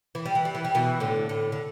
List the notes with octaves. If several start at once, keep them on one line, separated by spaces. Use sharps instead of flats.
E3
G3
E3
G3
E3
G3
B2 E3
A2 D3
A2 D3
D3